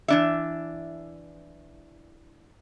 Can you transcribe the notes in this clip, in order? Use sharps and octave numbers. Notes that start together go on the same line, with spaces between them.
E3 D4 E5